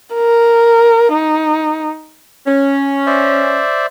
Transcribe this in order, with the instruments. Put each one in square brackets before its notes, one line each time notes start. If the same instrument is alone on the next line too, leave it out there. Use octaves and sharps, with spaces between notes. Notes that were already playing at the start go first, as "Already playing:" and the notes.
[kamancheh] A#4
D#4
[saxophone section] C#4
[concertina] C5 D5 E5